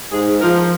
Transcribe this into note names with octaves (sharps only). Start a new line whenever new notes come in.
G#2 G#4
F3 A#4